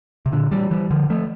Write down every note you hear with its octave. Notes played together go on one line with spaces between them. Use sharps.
C3
A#2 D3
E3 G3
E3 G3
D3 F3
F3 A3